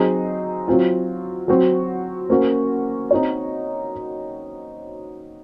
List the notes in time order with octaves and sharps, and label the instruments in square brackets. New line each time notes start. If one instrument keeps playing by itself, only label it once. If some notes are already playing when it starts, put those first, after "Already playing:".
Already playing: [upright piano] F#3 C4 D#4 G#4
F#3 C4 F4
F#3 C4 F#4
A#3 C#4 F#4 C5
C4 D#4 F#4 C#5